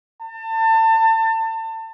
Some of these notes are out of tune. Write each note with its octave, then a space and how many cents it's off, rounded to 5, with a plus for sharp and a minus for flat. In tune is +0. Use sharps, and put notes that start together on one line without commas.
A5 +30